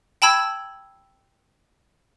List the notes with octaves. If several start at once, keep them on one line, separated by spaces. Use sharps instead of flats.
G5 A5 B5 E6 G#6